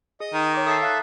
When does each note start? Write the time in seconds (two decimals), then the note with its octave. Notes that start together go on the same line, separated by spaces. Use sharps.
0.20 G#4 D#5 D#6
0.33 D#3
0.54 C#5 D6
0.67 A4 E5 D#6 C7
0.82 F5 F#6